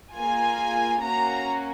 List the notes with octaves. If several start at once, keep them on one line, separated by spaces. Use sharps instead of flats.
A#3 F4 G#4 G#5
A#3 C#4 F#4 A#5